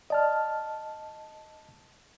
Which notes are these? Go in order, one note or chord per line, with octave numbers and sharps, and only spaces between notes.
D5 D#5 A5 F6